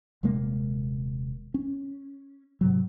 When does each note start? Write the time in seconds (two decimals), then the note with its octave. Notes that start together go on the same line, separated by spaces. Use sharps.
0.23 D#1 C3 G#3 A#3
1.54 C#4
2.61 G#2 C3 F#3